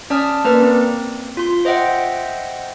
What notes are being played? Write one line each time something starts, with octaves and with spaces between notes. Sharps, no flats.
C#4 D5 A5 D#6 F6
A#3 A#4 B4 D5 A#5 F6
C4
F4 C6
C5 D#5 E5 F#5 G5